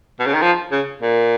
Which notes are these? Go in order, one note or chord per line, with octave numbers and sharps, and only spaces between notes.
B2
C#3
D#3
F3
C#3
A#2